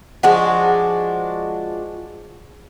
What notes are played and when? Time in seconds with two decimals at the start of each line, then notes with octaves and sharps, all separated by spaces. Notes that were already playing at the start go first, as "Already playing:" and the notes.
0.23 F3 G#3 D4 F#4